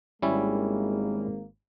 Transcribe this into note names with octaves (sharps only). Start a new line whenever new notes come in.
G#1 G3 G#3 A#3 C#4 E4